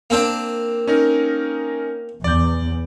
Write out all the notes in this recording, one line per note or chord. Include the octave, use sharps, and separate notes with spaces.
A#3 C4 D4
C#4 D#4 A#4
E2 D5 G6